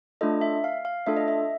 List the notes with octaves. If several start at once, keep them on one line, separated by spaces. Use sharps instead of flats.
A3 D4 F4 A4 D#5
E5
F5
F5
A3 D4 F4 A4 E5
D#5
E5